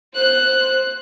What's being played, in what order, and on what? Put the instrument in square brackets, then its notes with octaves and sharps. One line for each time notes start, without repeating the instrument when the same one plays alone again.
[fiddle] C5 F#6